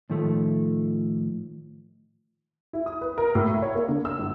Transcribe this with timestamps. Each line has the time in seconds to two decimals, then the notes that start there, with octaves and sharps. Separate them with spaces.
0.10 A2 D#3 F3 A3
2.73 E4
2.86 D#6
3.01 B4
3.18 A#4
3.35 A2
3.48 E5
3.62 C#5
3.75 A#3
3.88 D3
4.05 E6
4.19 G1